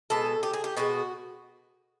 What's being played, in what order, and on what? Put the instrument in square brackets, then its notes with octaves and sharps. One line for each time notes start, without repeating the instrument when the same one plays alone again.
[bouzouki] B2 G#3 A4
G4
G#4
G4
B2 G#3 F#4